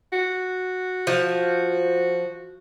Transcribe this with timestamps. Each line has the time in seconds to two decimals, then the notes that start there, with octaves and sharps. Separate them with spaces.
0.13 F#4
1.07 F3